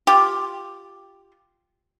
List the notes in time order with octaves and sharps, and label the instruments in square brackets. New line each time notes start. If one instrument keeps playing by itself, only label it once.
[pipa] F4 G4